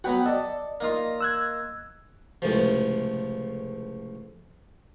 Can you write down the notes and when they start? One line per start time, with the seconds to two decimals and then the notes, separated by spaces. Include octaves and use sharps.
0.04 F#3 B3 F#4 F#5 G5
0.26 A4 D5 D#5
0.80 A#3 D#4 F4
1.21 E6 F#6 G#6
2.42 C#2 A2 C3 F3